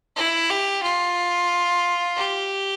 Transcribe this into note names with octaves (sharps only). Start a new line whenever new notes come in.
E4
G4
F4
G4